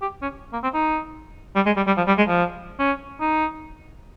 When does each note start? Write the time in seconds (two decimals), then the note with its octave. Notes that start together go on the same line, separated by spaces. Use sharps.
0.02 G4
0.22 C#4
0.53 A#3
0.63 C4
0.74 D#4
1.56 G3
1.66 G#3
1.77 G3
1.87 G3
1.97 F3
2.08 G3
2.18 G#3
2.28 F3
2.79 C#4
3.21 D#4